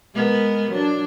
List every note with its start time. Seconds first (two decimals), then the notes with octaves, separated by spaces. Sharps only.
0.14 G#3 B3 A#4
0.71 F#3 D4